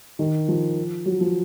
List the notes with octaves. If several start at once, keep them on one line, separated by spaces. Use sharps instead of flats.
D#3
F3
F#3
F3